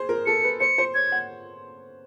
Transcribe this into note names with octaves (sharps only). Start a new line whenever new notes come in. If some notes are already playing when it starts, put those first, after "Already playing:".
Already playing: G#4 C5
A#4
A4 C#7
B4
C5 C#7
C5
C#5 G#6
F#5